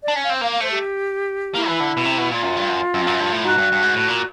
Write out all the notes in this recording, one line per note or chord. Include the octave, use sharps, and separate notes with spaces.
D5
D4
C#4
F5
C4
A#3 F5
F5
A3 C5
G4
A#3 E4
E3
D3
B2
C3
B2
A#2 F4
F#2
G2
F#2
F#2
F2
F#2
G2
A2
G#2 F#4
G2
G2
G#2
A2
A#2